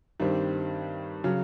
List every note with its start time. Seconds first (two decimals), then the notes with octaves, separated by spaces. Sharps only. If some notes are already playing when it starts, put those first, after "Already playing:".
0.20 G2 D#3 G3 C4
1.24 C#3 F#3